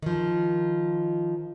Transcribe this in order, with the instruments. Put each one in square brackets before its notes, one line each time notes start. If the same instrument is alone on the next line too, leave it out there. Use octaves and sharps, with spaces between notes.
[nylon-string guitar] D#3 F3